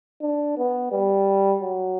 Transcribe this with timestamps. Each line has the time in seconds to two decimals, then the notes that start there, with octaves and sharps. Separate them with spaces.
0.21 D4
0.57 B3
0.92 G3
1.62 F#3